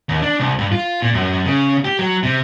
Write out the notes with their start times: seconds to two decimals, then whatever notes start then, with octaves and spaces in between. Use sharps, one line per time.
0.09 D#2
0.22 D4
0.40 C2
0.58 G2
0.72 F4
1.02 A#2
1.14 F#2
1.46 C#3
1.85 G4
1.99 F#3
2.23 C3